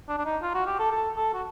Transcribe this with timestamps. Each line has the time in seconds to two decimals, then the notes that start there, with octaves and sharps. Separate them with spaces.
0.08 D4
0.18 D4
0.25 D#4
0.42 F4
0.54 F#4
0.66 G4
0.79 A4
0.92 A4
1.17 A4
1.34 F#4